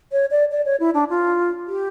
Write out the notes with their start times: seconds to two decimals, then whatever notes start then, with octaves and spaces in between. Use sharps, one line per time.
0.12 C#5
0.31 D5
0.51 D5
0.66 C#5
0.80 E4
0.94 D4
1.09 F4
1.67 G4